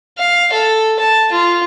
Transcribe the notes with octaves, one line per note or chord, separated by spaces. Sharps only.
F5
A4
A5
F4